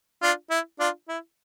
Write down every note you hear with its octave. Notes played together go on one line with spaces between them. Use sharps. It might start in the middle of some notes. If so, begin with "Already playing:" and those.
D4 F4
E4
D4 F4
E4